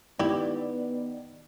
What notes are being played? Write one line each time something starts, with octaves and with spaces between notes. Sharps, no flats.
D#3 B3 E4 G4 D5